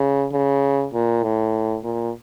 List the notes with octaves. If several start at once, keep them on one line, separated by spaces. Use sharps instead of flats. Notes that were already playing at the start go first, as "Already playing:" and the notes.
Already playing: C#3
C#3
A#2
A2
A#2